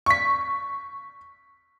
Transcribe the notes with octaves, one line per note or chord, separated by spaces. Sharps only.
C#6 B6